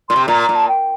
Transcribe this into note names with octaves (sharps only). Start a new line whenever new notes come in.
A#2 C6
C3
A#2 A#5
A#5
A#2
A5
G5